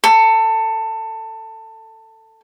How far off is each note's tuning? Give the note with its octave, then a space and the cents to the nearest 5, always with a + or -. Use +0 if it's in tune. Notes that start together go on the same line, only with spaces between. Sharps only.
A4 +20